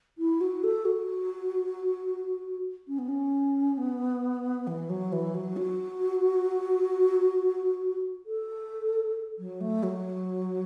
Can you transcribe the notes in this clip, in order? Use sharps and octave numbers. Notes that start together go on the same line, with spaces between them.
E4
F#4
A4
F#4
C#4
B3
C#4
B3
E3
F#3
E3
F#3
F#4
A4
F#3
A3
F#3